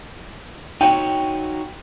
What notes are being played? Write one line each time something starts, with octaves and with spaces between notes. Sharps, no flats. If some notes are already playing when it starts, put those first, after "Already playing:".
D#4 F#4 C#5 G5